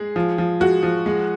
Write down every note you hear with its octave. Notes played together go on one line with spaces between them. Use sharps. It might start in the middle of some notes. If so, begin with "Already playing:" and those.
Already playing: G#3 G#4
F3
F3
G#3 F#4
F3
G#3